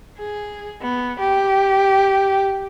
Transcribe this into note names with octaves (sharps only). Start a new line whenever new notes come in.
G#4
B3
G4